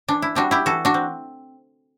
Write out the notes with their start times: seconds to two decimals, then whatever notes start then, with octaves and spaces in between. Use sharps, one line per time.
0.08 E3 D4
0.22 E4
0.35 G3 C4 D4 F#4
0.51 E4 G4
0.66 E3 F#4 A4
0.85 D4 F#4
0.94 C4